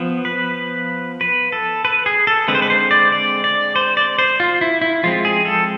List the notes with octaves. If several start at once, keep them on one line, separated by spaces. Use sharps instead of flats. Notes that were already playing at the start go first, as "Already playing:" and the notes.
Already playing: F3 B3
B4
B4
A4
B4
G#4
A4
D3 G#3 C4 B4
C5
B4
C5
D5
D5
D5
C5
D5
C5
F4
E4
E4
F3 G#3 C4 F4
G#4
A4